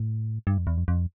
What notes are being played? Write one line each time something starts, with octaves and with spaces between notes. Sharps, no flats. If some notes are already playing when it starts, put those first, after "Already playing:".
Already playing: A2
G2
F2
E2
F2
F2